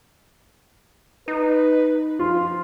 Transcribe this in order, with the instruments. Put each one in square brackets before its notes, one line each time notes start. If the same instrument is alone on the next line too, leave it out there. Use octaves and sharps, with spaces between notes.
[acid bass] D#4 [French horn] B4
[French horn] F3 [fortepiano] F4